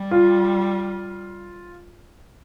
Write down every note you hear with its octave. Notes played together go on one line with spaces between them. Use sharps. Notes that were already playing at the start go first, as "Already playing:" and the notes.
Already playing: G3
F4